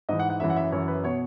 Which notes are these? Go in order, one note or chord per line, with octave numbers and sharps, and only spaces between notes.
G#2 E3 D#5
F#5
F#5
F#2 E3 E5
F#5
E5
F#2 E3 C#5
B4
B2 C#5